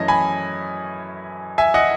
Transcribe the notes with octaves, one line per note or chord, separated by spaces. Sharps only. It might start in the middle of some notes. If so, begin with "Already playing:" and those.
Already playing: F#2 E3 A3 C#4 D#5
G#5 B5
E5 G#5
D#5 F#5